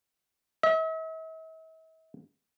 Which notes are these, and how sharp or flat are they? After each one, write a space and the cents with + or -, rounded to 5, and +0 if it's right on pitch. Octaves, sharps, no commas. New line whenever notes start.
E5 -45